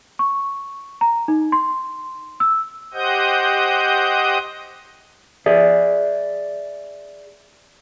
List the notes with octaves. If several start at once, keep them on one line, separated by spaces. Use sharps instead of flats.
C#6
A#5
D#4
C6
E6
G4 C5 D#5 F#5 D#6 G6
G#4 D5 E5